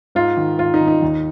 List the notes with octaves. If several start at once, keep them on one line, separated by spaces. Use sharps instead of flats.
G#2 F4
D#3
G#2 F4
D#4
D#3
D#4
D#2